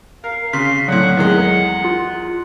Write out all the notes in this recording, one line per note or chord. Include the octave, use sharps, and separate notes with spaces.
A#4 F5
C#3 C6 B6
A2 D3 F#3 F#5
E2 D#3 G#3
F4